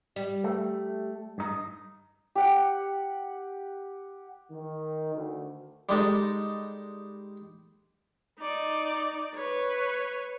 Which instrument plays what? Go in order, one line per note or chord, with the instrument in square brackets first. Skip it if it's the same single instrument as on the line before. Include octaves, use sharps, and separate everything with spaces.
[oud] G3
[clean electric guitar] A3
G2 D#4
[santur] G4 F#5
[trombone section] D#3
D2
[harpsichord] G3 G#3 D#4 A4
[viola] D#4 D5
B4 C#5